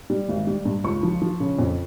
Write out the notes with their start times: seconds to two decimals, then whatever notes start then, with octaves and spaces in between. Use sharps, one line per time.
0.10 G3
0.28 G#1
0.47 G3
0.65 G2
0.84 C#2 C#6
1.03 F3
1.22 F3
1.40 C#3
1.59 F2